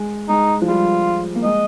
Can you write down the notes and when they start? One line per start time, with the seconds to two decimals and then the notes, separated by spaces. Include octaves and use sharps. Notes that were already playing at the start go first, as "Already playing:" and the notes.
Already playing: G#3
0.29 G#3 D#4
0.62 F3
0.68 G3 F4
1.35 A#3
1.44 G#3 D#5